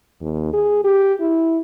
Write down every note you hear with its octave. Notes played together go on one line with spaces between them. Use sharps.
D#2
G#4
G4
E4